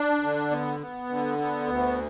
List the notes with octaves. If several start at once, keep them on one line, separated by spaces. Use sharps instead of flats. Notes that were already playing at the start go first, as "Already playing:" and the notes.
Already playing: D4
D3
B3
B3
D3
B3
D2